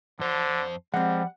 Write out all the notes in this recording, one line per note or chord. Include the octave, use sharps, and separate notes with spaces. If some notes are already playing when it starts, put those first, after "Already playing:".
F2 D3 C5 A5
F3 G3 G#3 C4 F#5